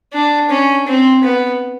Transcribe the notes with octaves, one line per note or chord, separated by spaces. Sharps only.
D4
C#4
C4
B3